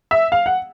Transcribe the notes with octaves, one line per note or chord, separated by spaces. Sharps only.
E5
F5
F#5